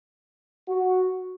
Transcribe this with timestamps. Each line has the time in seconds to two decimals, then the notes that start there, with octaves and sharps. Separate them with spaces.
0.69 F#4